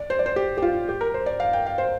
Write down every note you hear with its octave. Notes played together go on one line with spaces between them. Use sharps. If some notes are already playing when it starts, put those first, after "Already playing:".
Already playing: D5
C5
D5
C5
G4
G4
F4
G4
A#4
C5
D5
F5
G5
F5
C5